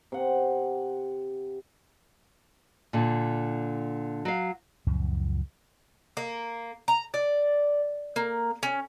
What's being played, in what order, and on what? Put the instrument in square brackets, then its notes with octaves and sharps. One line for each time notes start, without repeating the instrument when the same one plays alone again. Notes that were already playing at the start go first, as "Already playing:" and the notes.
[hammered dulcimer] C3 F#5
[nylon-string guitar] A#2 D3
F#3 F5
[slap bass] C#2 F#2 A#2 F3
[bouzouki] A#3
A#5
D5
A#3
C#4